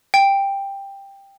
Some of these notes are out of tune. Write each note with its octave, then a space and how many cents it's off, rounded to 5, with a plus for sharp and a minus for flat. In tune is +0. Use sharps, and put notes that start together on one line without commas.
G5 +10